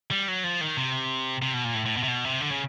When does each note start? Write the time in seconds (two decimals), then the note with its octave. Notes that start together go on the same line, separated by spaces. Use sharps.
0.11 G3
0.28 F#3
0.44 F3
0.61 D#3
0.77 C3
1.42 C3
1.54 B2
1.64 A#2
1.75 A2
1.86 A2
1.97 B2
2.03 C3
2.08 B2
2.25 C3
2.41 D3
2.52 C#3